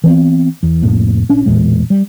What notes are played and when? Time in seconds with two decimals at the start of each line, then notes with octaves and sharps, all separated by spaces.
0.04 E3 B3 C4
0.63 E2
0.82 C2 F2 A2 A#3
1.29 A#1 C#4 D4
1.46 A1 E2 A#2 G#3
1.90 G3